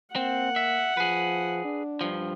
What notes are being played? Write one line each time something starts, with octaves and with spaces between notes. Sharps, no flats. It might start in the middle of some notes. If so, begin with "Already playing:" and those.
A#3 C4 F#5
E5
F3 G#4 B4
D4
G2 F3